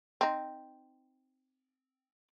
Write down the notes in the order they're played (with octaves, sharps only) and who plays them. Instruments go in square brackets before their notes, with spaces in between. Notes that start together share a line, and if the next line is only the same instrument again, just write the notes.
[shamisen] C4 D#4